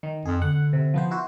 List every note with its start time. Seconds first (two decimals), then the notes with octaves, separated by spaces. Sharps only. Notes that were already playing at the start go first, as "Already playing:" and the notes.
0.03 D#3
0.25 F2 G#4
0.42 D3 F#5
0.73 C3
0.94 F3 B3 C5
1.11 E4 F#4 C5